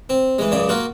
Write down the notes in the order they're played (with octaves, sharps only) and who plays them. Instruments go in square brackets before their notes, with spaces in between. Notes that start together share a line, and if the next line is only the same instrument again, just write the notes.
[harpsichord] C4
E3 G#3
C#2 F#2 C#3 D5
A#3 F4 F#4